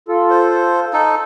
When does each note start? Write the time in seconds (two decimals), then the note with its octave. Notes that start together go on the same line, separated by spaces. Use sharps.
0.09 F4 A4
0.30 C5
0.93 D#4 A4